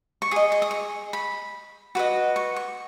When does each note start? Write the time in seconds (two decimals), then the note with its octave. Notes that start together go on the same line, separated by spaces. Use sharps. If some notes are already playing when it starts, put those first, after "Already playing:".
0.22 C#6
0.31 G#4 D#5 D#6
0.52 C#6
0.62 D#6
0.71 C#6
1.13 B5
1.95 F#4 B4 D#5
2.36 C#6
2.56 C#6